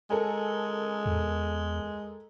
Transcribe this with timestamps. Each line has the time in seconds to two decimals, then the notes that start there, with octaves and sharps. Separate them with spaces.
0.10 G#3 A4 A#4 G#5
1.06 E2